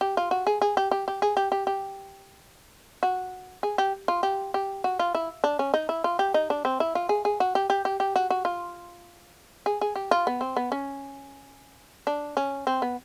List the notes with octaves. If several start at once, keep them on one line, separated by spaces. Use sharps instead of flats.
G4
F4
F#4
G#4
G#4
G4
G4
G4
G#4
G4
G4
G4
F#4
G#4
G4
F4
G4
G4
F#4
F4
E4
D4
C#4
D#4
E4
F4
G4
D#4
D4
C4
E4
F4
G#4
G#4
F#4
G4
G4
G4
G4
F#4
F#4
F4
G#4
G#4
G4
F4
B3
C4
B3
C#4
D4
C#4
C4
B3